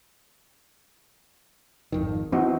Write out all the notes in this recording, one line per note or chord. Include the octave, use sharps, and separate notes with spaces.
G#1 F2 D#3
E3 C4 D#4 F#4